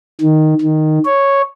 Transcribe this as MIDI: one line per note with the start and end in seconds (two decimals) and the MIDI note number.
0.21 0.54 51
0.61 0.99 51
1.05 1.41 73